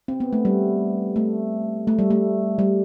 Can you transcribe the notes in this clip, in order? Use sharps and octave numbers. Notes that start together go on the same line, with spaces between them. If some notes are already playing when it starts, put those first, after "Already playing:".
C4
B3
A3
G3
A3
A3
G3
A3
G3